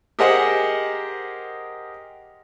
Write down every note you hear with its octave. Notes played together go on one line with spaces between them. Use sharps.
G4 G#4 A#4 C5 D#5 F#5